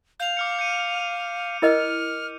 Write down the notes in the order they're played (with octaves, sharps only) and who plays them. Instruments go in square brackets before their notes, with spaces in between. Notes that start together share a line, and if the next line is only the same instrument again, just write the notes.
[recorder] F5 [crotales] G6 F7
[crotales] D6 F6 C#7
G6 C#7 D#7
[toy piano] E4 A#4 D#5 [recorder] F6